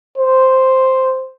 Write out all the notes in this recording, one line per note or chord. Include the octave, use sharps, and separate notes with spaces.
C5